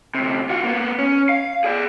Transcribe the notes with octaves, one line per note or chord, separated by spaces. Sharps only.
D2 C3
F4 F#4
A#3 B3
C#4
F5
G#4 D5